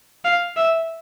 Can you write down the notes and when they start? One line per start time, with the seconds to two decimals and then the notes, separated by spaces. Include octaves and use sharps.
0.25 F5
0.57 E5